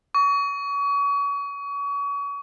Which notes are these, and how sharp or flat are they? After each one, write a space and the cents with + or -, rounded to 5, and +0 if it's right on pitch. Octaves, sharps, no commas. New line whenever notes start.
C#6 +35